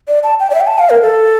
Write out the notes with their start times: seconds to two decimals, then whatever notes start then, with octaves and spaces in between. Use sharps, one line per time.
0.08 D5
0.23 A5
0.40 G5
0.50 D5
0.55 E5
0.61 G5
0.67 A5
0.79 F5
0.90 A#4
1.02 A4